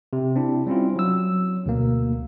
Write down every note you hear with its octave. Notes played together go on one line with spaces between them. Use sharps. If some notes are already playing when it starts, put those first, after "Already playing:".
C3
C4 D4 E4
G3 C4 C#4 E4 F4
F#3 E6
D2 B2 A#3